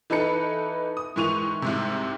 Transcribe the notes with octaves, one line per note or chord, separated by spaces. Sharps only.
E3 D#4 A4 B4 C#7
D#6
G#2 D#3 E3 C#6 D#7 F7
C2 G#2 C3